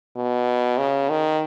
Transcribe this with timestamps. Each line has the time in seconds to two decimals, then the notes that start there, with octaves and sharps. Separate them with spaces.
0.16 B2
0.78 C#3
1.10 D#3